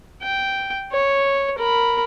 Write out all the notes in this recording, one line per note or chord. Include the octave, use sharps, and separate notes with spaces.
G5
C#5
A#4 B5